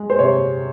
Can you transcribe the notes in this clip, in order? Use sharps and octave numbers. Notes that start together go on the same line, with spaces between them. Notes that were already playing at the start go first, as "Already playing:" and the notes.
Already playing: G#3
C5
C3 C#5